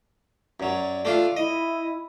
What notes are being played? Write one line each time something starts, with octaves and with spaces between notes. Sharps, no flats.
F#2 F#3 D5
A3 D4 F4
E4 D#5